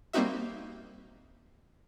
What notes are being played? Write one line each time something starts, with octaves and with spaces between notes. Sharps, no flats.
G3 A#3 C4 D#4 F#4 E5